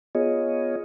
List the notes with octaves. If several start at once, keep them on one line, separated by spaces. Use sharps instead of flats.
B3 F4 G#4 C#5 D#5